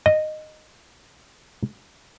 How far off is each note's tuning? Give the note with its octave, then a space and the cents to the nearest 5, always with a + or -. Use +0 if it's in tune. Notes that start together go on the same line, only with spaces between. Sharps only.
D#5 -10